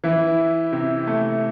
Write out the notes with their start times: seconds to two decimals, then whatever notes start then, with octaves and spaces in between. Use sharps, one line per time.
0.04 E3 E4
0.72 C3 C4
1.07 A3